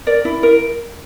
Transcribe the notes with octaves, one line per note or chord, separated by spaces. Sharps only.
A#4 D5
E4
A#4